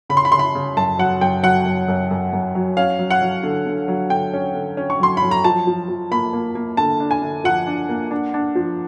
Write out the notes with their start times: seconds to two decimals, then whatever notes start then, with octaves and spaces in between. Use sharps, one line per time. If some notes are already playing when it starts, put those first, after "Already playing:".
0.09 C#3 B5
0.17 C6
0.25 B5
0.32 C#3 C6
0.39 B5
0.55 C#3
0.77 F#2 A5
0.99 F#3 F#5
1.21 F#2 G5
1.43 F#3 F#5
1.65 F#2
1.88 F#2
2.11 F#2
2.33 F#2
2.55 F#3
2.77 C#4 F5
2.99 F#3
3.10 F#5
3.22 F#3
3.43 D3
3.66 D3
3.88 F#3
4.10 D3 G5
4.33 C#4
4.55 D3
4.77 C#4
4.90 C#6
5.00 F#3 C6
5.17 B5
5.22 F#3
5.31 A#5
5.44 F3 A5
5.67 F3
5.89 F3
6.11 A#3 B5
6.33 A#3
6.55 A#3
6.77 D3 A5
7.00 D4
7.11 G#5
7.22 D3
7.44 F3 F#5
7.67 D4
7.89 A#3
8.11 D4
8.34 D4
8.55 F3